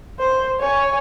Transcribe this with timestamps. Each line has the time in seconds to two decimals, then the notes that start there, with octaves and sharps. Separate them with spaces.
0.20 C5
0.60 C#5 G#5